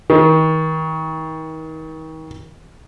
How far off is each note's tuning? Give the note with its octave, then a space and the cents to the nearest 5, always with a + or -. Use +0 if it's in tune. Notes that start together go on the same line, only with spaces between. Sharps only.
D#3 +35